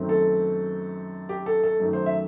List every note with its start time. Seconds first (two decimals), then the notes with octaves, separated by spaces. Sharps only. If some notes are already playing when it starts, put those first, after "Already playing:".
Already playing: F#2 D#3 A3 C4
0.09 A4
1.29 G4
1.46 A4
1.63 A4
1.80 F#2 D#3 A3
1.93 C5
2.06 E5